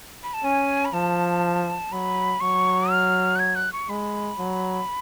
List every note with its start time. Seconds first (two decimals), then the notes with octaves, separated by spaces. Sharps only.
0.24 B5
0.34 A5
0.44 C#4 G#5
0.85 B5
0.93 F3 A5
1.92 F#3 B5
2.40 F#3 C#6
2.91 F6
3.35 F#6
3.39 G#6
3.55 F#6
3.73 C#6
3.89 G#3 B5
4.38 F#3